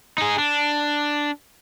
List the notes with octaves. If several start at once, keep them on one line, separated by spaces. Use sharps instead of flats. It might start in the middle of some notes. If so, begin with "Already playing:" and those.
D#4 G#4
D4